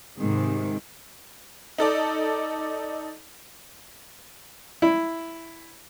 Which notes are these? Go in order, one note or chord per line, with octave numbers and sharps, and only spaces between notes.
G#2 C3 D#3 G#3
D#4 A4 D5
E4